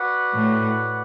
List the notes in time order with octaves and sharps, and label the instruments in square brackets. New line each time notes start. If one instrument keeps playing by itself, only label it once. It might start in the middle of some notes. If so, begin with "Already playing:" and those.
Already playing: [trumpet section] F#4 B4 D5 F#5
[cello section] A2